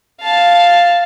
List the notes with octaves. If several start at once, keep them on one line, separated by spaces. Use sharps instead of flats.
F5 A5